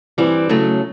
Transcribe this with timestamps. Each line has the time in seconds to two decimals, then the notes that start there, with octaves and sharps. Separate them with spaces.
0.18 G2 E3 G3 C4
0.49 C#3 F#3 A3